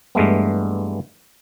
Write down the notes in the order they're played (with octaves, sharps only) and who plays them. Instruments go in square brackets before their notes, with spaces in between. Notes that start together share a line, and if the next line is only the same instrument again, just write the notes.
[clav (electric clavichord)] G2 E3 G#3 A3 B3